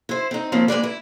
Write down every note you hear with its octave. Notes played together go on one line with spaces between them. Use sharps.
E4 C5
C4 D#4
C#3 F3 A#3 C4
G#3 A#3 B4 D5
E4